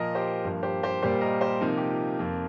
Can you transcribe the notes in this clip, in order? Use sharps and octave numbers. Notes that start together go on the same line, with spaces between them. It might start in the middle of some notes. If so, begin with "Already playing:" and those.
Already playing: A#2 F3 A#3 A#4 D#5
G4 C5
G2 F3 A#3
G4 C5
G4 C5
A#2 G3 A#3 G4 C5
A#4 D#5
G4 C5
C3 F3 A#3 D#4
G4
F4
F2 F3 A#3